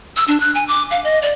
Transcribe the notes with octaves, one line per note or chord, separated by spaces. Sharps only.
E6
D4
F#6
G#5
D6
F5
D#5
D5